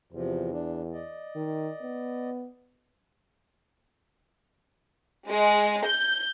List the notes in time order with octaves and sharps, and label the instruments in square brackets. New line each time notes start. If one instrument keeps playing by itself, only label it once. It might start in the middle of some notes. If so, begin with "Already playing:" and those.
[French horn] E2 [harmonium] C3 F3
[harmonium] D4
D5 D#5
[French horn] D#3
B3
[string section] G#3
G6